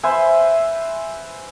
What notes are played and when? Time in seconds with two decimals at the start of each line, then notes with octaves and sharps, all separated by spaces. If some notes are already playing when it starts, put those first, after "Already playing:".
0.03 B4 C5 E5 G#5